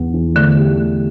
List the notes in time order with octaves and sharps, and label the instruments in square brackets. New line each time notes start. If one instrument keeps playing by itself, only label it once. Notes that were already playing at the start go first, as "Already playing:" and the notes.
Already playing: [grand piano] E2 B3
E2
[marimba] D3 [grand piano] A3
[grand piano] G4
A3